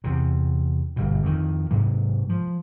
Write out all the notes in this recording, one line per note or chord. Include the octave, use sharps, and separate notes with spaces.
E2 C3
G1 B2
F2 D#3
G#2 C3 F#3
F3